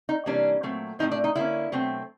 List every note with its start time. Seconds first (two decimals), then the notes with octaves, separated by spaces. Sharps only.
0.09 D#4
0.26 C3 E3 G3 A#3 C#4 D4
0.63 A#2 F#3 A3 C4
0.99 A2 F3 A3 C4 D#4
1.11 D4
1.24 D#4
1.36 D3 G3 A#3 C#4 E4
1.72 B2 F#3 A3 C4